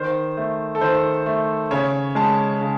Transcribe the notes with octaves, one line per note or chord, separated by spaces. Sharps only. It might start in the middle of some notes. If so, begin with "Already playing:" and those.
Already playing: D#3 C5
A3
A4
D#3 C5
A3
C#3 C#5
G#3 A5
C#3